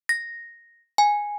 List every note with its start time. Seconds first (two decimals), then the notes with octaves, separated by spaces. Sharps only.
0.09 A#6
0.98 G#5